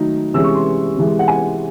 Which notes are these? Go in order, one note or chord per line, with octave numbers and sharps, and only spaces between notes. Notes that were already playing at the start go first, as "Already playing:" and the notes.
Already playing: D#3 F#3 A3 D#4
C3 E3 G#3 C#4 E6
C#6
C6
C3 E3 G#3
F#5
G#5